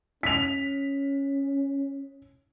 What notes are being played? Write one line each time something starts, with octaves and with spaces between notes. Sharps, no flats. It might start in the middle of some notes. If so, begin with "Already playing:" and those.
C#4 B6 F7